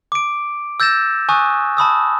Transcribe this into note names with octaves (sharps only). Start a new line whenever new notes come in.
D6 D7
E6 G6 A6 A#6 E7
G#5 C#6 D#6 F#6
A5 B5 D#6 E6